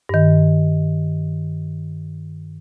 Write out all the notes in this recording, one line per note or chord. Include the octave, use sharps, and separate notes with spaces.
G2 D#3